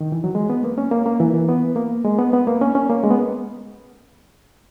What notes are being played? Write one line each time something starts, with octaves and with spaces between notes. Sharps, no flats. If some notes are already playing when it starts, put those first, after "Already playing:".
D#3
E3
F#3
G#3
B3
A#3
C#4
A#3
A#3
E3
E3
B3
A#3
G#3
B3
B3
A#3
C#4
C#4
A#3
G#3
B3